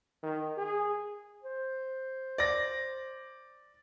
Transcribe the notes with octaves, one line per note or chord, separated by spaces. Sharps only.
D#3
G#4
C5
D5 A#6